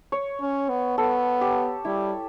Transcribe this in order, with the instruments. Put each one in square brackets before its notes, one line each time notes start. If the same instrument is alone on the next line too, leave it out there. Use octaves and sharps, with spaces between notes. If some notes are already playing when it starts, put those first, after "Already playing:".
[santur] C#5
[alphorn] C#4
B3
[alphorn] B3 [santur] A4
[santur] G4
[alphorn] G3 [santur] E4